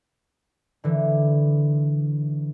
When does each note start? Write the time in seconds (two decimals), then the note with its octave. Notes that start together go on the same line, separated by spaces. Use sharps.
0.84 D3 E3